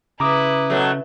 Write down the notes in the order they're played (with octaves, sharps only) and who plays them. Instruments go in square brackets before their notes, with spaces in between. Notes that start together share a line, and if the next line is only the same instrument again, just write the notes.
[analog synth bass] C#3 [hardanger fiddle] E4 B4 [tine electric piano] A#5 D6 D#6
[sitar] B2 F#3 A3